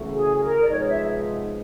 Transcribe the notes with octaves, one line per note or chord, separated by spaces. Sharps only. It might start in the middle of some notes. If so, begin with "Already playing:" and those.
Already playing: E2 C#3 F#3 A3
G#4
A#4
D5
C3 F3 G#3 B3 D#4 C#5
E5